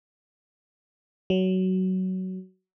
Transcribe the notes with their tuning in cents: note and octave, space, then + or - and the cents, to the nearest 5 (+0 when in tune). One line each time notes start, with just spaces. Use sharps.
F#3 +15